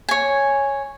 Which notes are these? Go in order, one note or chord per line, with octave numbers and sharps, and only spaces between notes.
C#5 G#5